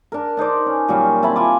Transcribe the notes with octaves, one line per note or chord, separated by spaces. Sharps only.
D4 A#4
D4 D#4 C5 D5
C#4
A#2 F#3 G3 C#4
C4 E4 A5 B5
F4 G#5 D6